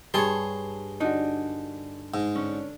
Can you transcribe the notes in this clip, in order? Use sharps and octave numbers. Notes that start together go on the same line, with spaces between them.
G2 G#4 C#5 A5 C6
D3 D4 D#4 F#4
G#2
D3 C#4